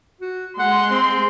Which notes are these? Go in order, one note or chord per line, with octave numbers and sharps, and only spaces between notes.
F#4
G#3 F#5 C6
C4